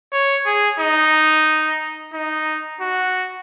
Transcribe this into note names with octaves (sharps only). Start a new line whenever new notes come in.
C#5
G#4
D#4
D#4
F#4